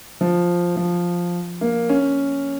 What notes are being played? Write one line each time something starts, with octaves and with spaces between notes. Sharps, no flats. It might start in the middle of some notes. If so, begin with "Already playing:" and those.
F3
F3
A#3
C#4